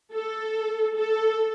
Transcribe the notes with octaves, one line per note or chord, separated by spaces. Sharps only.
A4
A4